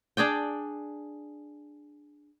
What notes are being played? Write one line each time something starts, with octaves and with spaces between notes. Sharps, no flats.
D4 G#4 D5 G5